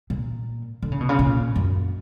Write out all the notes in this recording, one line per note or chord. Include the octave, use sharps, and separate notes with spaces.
A#2
D3
C#3
B2
C#3
A#2
F#2